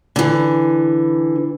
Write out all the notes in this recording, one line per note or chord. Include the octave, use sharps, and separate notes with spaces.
D3 E3